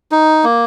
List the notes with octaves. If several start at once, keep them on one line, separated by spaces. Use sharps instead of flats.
D#4
A#3